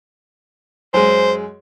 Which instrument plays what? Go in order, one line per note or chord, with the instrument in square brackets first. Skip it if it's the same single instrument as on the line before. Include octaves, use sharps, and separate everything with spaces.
[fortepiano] F#2 G#3 [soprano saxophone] C5